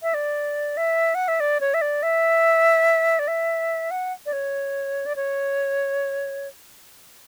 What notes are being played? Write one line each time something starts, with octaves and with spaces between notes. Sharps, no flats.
E5
D5
E5
F#5
E5
D5
C#5
E5
D5
E5
D5
E5
F#5
D5
C#5
D5
C#5